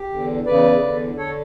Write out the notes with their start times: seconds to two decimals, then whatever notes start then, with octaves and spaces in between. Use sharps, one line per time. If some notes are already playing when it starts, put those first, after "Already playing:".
Already playing: G4
0.11 E2 D3
0.46 E2 C#3 E3 B4 D5
0.81 E2 D3
1.17 D3 A4 C#5